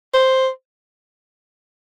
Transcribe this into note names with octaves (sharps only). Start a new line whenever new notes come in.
C5